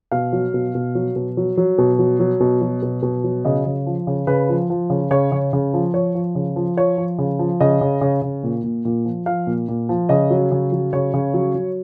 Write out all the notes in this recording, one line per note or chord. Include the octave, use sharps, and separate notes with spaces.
B2 F5
F#3
B2
B2
F#3
B2
F#3
F#3
B2
F#3
F#3
B2
F#3
B2
B2
F#3
C#3 D#5
C#3
F3
C#3
C#3 B4
F3
F3
C#3
C#3 C#5
C#3
C#3
F3
F3 C#5
F3
C#3
F3
F3 C#5
F3
C#3
F3
C#3 D#5
C#3
C#3
C#3
A#2
A#2
A#2
F3
F3 F5
A#2
A#2
F3
C#3 D#5
F#3
C#3
F#3
C#3 C#5
C#3
F#3
F#3